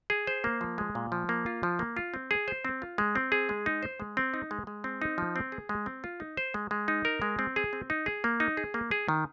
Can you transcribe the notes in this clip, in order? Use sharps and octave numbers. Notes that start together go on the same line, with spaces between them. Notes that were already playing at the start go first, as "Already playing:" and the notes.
G#4
C5
A#3
F3
G#3
A#2
F3
A#3
F4
F3
A#3
F4
C4
G#4
C5
C4
F4
G#3
C4
G#4
G#3
D#4
C5
G#3
C4
D#4
G#3
G#3
C4
D#4
F3
C4
G#4
G#3
C4
F4
D#4
C5
G#3
G#3
D#4
A#4
G#3
C4
G#4
C4
D#4
G#4
A#3
D#4
G#4
A#3
G#4
D#3